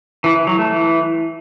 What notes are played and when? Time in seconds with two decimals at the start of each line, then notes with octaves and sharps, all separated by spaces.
0.24 E3
0.36 E3
0.47 F#3
0.59 A3
0.70 E3